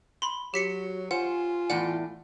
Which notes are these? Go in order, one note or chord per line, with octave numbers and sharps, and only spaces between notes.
B5 C6
F#3 F#4 G4 B6 C#7
F4 C5 F#5 G#5
E2 A2 D5 F#5